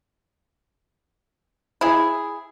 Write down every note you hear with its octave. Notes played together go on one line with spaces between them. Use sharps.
E4 G#4